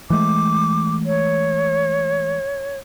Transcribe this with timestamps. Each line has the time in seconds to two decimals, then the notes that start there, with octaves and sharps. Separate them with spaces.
0.10 E3 G#3 A3 D6
1.06 C#5